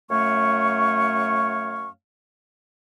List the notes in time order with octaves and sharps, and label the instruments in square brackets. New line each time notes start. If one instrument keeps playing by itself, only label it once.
[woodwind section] F#2 A3 C#5 F5 C#6